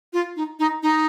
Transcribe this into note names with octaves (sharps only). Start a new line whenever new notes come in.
F4
D#4
D#4
D#4